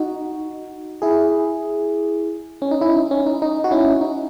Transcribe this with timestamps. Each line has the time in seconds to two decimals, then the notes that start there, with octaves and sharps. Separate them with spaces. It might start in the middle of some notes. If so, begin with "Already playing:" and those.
Already playing: D#4 F#4
1.02 E4 G#4
2.62 C#4
2.71 D#4
2.81 C#4 E4
2.97 D#4
3.11 C#4
3.26 D#4
3.42 D#4
3.64 F#4
3.71 C#4 E4
4.01 D#4